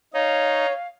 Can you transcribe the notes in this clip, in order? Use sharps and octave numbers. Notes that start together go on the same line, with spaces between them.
D#4 C#5 F5